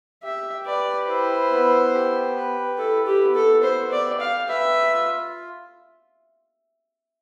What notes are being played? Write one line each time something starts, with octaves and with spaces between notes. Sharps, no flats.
G4 E5
B4 D5
E4 C5
B3
G4
B4
E4 A4
G4
B3
A4
C5 E5
D5
G5
F5
B4 E5
F4